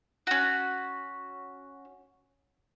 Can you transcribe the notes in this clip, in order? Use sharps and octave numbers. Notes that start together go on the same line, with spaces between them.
C#4 F#4